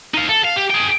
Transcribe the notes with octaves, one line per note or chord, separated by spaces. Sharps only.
D#4 F5
A4
F5
G4
G#4 G5